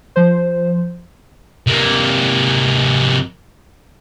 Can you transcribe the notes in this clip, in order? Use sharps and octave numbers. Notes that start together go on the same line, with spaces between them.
F3 C5
C3 A#3